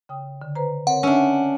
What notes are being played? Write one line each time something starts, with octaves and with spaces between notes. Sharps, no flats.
C#3 G5 D#6
D3
B4 C5 A#5
C4 A#4 C#5 F#5
C#4 D4 E5 E6